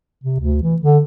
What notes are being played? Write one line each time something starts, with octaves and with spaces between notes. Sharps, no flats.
C3
D2
E3
D3